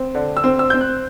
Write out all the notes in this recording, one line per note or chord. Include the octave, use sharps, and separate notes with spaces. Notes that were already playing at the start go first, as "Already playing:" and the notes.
Already playing: C4
D3
E6
C4
E6
C4 G6
F#6